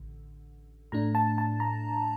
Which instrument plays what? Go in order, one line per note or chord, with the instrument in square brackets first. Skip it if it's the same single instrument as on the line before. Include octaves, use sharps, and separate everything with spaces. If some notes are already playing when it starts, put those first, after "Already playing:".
Already playing: [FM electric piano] A1 D3
A2 A3 D4 A#5
A5
A5
A#5